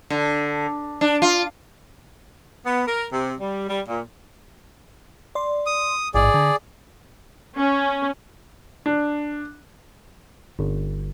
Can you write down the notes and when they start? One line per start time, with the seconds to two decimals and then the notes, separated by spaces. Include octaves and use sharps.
0.10 D3
1.01 D4
1.22 F4
2.66 B3
2.88 A#4
3.13 C3
3.40 G3
3.70 G3
3.89 A#2
5.35 D5 C6
5.66 D#6
6.14 A1 G#2 G#4 D5
6.34 D3
7.56 C#4
8.86 D4
10.59 G1